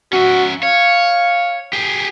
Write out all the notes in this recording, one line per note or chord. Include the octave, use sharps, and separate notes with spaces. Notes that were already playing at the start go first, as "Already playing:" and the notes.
C#4 F#4 E5
C#5 F5
G4 G#4